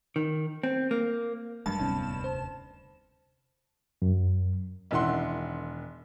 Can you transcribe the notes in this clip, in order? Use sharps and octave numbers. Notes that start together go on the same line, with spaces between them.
D#3
C4
A#3
F#1 G2 F#3 G#3 A5
E1 D2 C3 B3 C#4 D#4
C5
F#2
E1 D#3 E4 F#5 C6